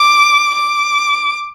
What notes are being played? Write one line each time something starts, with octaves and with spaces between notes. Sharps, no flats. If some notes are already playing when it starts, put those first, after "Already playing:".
Already playing: D6
D6